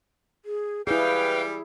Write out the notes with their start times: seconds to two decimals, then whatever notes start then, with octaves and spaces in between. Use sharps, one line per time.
0.45 G#4
0.87 G3 E4 G#4 B4 F5 G5